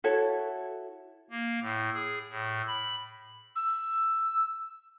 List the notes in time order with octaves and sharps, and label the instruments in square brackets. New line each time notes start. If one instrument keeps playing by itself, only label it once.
[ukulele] E4 F#4 A4 C#5
[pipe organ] A#3
A2
G#4
A2
B5
[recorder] E6